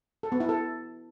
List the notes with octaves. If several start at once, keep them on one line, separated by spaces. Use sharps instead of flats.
A4
B3
E4
A4